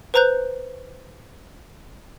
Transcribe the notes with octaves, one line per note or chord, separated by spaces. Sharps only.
B4 C5 A#5 F#6 G6